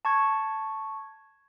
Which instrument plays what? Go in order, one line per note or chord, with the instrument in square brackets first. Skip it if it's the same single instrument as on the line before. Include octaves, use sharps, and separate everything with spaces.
[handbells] A5 C#6 G#6